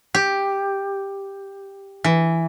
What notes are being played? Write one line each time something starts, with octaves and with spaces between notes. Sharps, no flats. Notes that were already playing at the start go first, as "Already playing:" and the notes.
G4
E3